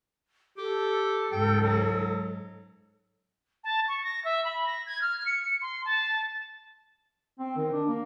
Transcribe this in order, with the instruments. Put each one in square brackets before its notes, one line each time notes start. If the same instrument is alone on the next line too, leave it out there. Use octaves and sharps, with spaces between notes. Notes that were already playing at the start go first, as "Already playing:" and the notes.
[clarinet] G4 [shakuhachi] A4
[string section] C#2 G#2 [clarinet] G5
[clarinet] F#3
[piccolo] A5
C#6
A#6
E5
B5
A#6
G#6
F6
C#7
C6
A5
[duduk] C4
D#3
D4
A#3